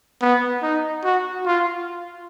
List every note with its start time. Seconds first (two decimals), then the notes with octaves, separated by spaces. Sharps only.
0.21 B3
0.63 D#4
1.04 F#4
1.46 F4